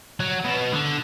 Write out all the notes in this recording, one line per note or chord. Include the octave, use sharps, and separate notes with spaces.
F#3
B2
D3